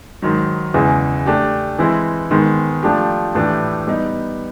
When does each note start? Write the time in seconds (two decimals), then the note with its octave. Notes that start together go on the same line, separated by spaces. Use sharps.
0.22 G#2 D#3 F#3
0.74 E2 C#3 E3 G#3
1.26 A3 D4 G4
1.79 E3 G#3 C4 E4
2.31 G#2 D#3 G#3 B3
2.83 F3 A3 D4 G4
3.35 A2 E3 A3 D4 G4
3.87 G3 B3 D#4